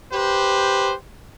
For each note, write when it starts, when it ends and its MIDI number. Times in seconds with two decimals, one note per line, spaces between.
0.12 0.93 67
0.12 0.93 71
0.12 0.93 72